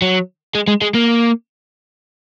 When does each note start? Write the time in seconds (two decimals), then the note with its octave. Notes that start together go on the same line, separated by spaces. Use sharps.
0.02 F#3
0.55 G#3
0.68 G#3
0.81 G#3
0.94 A#3